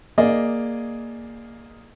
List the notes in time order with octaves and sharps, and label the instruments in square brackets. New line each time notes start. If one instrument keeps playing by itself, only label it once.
[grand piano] A#3 G#4 D5 D#5